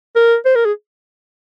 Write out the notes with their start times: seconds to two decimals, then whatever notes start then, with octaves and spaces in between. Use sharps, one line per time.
0.16 A#4
0.45 C5
0.55 A#4
0.65 G#4